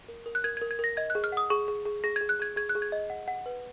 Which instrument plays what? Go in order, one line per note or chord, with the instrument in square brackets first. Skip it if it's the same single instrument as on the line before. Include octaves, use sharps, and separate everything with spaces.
[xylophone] A#4
A#4
F#6
A#4 G#6
A#4 G#6
G#6
A#4 A#6
D#5 G#6
F#6
G#4
F6
F#5 D#6
G#4 C#6
G#4
G#4
G#4 A#6
G#4 G#6
F#6
G#4 G#6
G#4 G#6
F#6
G#4
G#6
D#5
F#5
F#5
B4